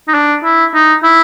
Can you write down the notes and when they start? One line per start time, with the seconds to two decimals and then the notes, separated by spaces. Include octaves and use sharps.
0.08 D#4
0.14 D4
0.44 E4
0.74 D#4
1.03 E4